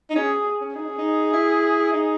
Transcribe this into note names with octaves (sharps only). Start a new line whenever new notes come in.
D#4
C#4 G#4
C#4
D#4 G#4
C#4
D#4
E4
D#4